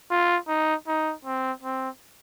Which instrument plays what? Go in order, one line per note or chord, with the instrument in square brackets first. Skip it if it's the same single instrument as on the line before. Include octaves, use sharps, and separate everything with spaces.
[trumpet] F4
D#4
D#4
C4
C4